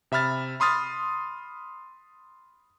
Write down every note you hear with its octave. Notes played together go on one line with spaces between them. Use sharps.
C3 E5 B5 F6 A6
B5 C6 D#6 F6 A6